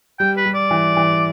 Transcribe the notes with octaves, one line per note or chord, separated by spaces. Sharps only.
G3 G5
B4
G3
D5
E3
E3